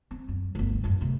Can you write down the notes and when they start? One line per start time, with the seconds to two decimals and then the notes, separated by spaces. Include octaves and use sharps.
0.11 C4
0.28 F#2
0.55 G1 D2
0.83 A1 F#2
1.01 A2 C3